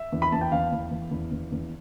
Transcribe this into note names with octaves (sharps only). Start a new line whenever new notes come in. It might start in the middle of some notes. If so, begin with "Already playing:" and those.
Already playing: E5
E2
B5
E2 A5
G5
E2 F5
E2
E2
E2
E2
E2